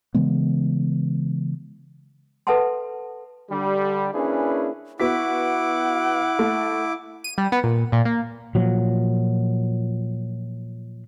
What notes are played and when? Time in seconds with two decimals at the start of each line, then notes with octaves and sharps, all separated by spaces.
0.14 C#3 E3 G#3 B3
2.47 A4 B4 E5 F#5 A5 C6
3.50 D3 G3
4.14 A#3 C#4 D4 E4 G#4 B4
5.00 B3 E4 F#4 F#5 D6 B6
6.39 A3
7.24 D#7
7.38 G3
7.52 B3
7.64 A#2
7.92 A#2
8.05 A#3
8.55 A#2 F3 F#3